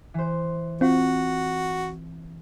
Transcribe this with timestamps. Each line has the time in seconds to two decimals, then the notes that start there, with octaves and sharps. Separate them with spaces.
0.14 E3 C5
0.81 C4 F4 F#4